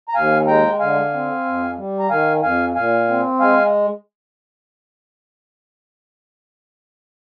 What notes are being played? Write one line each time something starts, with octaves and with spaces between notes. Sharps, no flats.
A#5
D#2 F5 G#5
G#3 G5 A#5
D3 F5 G#5
C4
F2
G3
A#5
D#3 F5 G#5
F2 F5 G#5
A#2 F5 G#5
C4
G#3 F5 G#5